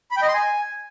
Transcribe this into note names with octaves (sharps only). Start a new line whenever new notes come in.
B5
G5
D#5
C6
G#5